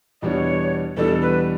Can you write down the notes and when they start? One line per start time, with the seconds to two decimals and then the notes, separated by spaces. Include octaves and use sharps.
0.22 E2 B2 G3 D4 C#5 D#5
0.97 E2 B2 G3 D4 A4
1.22 B4